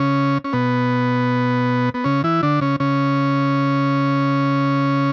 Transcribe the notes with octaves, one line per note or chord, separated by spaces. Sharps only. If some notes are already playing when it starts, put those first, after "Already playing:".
Already playing: C#3 C#4
C#4
B2 B3
B3
C#3 C#4
E3 E4
D3 D4
C#3 C#4
C#3 C#4